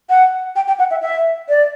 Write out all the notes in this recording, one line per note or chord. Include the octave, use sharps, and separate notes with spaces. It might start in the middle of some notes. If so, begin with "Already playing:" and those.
F#5
G5
G5
F#5
E5
E5
D5